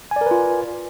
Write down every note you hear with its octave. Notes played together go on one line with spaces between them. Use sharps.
F4 A#4 B4 D5 G#5